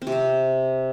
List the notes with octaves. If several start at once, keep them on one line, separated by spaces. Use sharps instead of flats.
C4
C3
C4